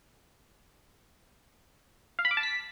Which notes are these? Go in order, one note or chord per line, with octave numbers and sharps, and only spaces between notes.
F5
B5
D6
A5
B6